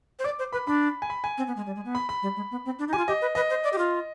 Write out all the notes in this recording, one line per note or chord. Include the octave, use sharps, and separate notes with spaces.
C5
D5 D6
C5
B4 B5
D4 B5
G#5
B5
G#5
C4
B3
G#3
G3
G#3
B3
B5
B5
G3
G#3
B3
C4
D4
D#4
F4 G4 G#5
G4 D#5
B4
B4 D#5
C5
D5
G4
F4